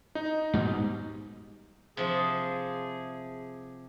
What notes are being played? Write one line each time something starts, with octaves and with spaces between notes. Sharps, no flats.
D#4
G#2 B2 G3
C3 F3 G#4